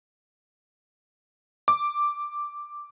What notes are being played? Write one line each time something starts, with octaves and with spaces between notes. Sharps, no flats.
D6